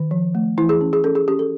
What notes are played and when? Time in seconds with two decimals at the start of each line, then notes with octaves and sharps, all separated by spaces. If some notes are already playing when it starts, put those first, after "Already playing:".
Already playing: D#3
0.11 F3
0.35 A3
0.58 E3 E4
0.69 G#4
0.81 C#4
0.93 G#4
1.04 C#4 A4
1.15 G#4
1.28 C#4 G4
1.39 A4